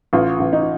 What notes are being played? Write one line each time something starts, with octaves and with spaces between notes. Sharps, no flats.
A1 F4
A1
D#4
F4